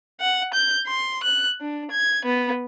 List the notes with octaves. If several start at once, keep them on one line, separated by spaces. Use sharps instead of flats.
F#5
G6
C6
F#6
D4
G#6
B3